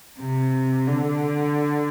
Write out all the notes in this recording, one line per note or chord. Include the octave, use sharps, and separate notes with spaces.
C3
D3